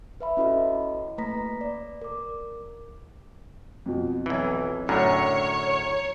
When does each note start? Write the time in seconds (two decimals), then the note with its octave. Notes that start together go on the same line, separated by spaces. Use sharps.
0.21 B4 E5 B5
0.37 C#4 E4 F#4 A4 D#5
1.18 A3 A#3 B4 A#5 A#6 B6
1.61 D5
2.02 A#4 D6
3.86 F2 B2
4.26 B1 E3
4.89 F#2 A2 D3 C#5 A#5